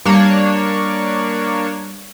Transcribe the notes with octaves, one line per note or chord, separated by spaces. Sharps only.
G3 A#3 D4 C#5